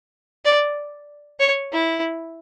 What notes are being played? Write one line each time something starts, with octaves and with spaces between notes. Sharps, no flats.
D5
C#5
E4